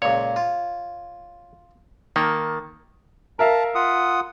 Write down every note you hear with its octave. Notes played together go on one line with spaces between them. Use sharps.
C#2 A#2 C#5
F4
D#3 A#3 A5 A#5
A#4 E5 F5 A5 A#5
F4 F#5 D#6